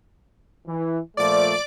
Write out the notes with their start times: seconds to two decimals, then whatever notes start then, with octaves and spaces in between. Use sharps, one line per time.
0.67 E3
1.17 A#2 F3 A3 D5 D6